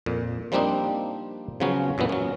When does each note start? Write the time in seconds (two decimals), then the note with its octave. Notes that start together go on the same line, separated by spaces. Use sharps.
0.06 F2 A#2
0.52 F3 G3 A#3 C4 D4 D#4
1.60 C#3 F3 F#3 B3 C#4
1.98 F#2 A#2 E3 B3
2.09 F#3 C#4